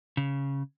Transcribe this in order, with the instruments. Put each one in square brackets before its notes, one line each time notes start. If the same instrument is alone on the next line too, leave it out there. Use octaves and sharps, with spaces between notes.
[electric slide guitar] C#3